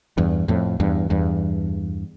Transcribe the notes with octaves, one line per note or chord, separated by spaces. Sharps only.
E2 G2
F2 A2
E2 G2
E2 G2